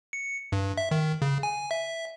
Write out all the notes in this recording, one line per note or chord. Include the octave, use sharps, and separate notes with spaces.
C#7
G2
E5
D#3
C#3
G#5
E5